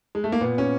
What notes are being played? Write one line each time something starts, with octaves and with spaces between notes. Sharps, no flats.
G#3
A3
A#3
A#2 B3
C#4